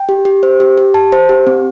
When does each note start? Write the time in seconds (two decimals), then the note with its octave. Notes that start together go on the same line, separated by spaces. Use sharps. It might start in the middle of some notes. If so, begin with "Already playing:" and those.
Already playing: G5
0.09 G4
0.25 G4
0.43 C5
0.60 G4
0.78 G4
0.94 A5
1.12 C5
1.29 G4
1.47 C4